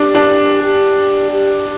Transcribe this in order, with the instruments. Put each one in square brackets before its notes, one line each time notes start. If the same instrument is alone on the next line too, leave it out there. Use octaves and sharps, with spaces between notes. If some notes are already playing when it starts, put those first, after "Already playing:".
Already playing: [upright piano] D4 [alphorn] G4
[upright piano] D4
[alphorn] G4
G4